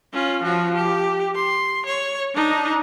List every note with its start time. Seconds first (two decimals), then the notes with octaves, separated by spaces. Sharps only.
0.13 C#4 F4
0.43 F3 F#4
0.75 G4
1.35 C6
1.86 C#5
2.35 D4 D#4